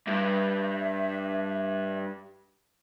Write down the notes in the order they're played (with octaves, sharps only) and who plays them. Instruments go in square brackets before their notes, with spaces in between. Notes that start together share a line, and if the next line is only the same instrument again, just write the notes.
[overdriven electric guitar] G2 [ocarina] E5